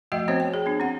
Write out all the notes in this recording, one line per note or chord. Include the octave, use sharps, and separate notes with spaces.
F3 A3 F#4 D#5 E5 G5
B3 C4 F#4 C5 C#5
G5
G#4
B3 D4
C4 F#5